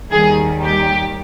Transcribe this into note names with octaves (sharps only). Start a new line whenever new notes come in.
D#2 D#3 G3 G#4
G4